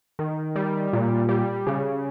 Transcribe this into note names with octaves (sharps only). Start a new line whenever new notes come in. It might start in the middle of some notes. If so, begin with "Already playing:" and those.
D#3
G3
A#2
G3
C#3